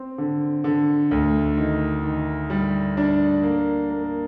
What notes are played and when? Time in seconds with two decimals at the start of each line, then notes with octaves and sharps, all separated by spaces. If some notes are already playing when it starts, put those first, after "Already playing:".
Already playing: C4
0.18 D3
0.64 D3
1.11 D2
1.57 D#3
2.04 D#3
2.50 G3
2.97 D4
3.43 A#3
3.90 A#3